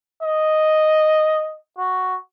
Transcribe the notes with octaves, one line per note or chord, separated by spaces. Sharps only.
D#5
F#4